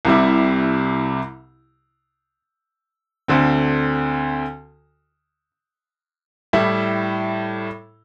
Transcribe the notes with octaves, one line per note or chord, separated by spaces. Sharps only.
C2 C3 G3 E4
D2 D3 C4
A2 G3 E4